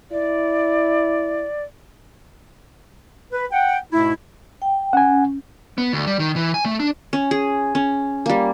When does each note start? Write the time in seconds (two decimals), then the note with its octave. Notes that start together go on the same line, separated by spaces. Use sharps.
0.12 E4 D5
3.32 B4
3.52 F#5 G5
3.93 G#2 B2 A3 E4
4.62 G5
4.93 C#4 F#5 G#5
5.78 B3
5.93 D2
6.07 G3
6.19 D#3
6.36 E3
6.54 G#5
6.65 A3
6.80 D4
7.13 C#4
7.31 G#4
7.75 C#4
8.26 G3 A#3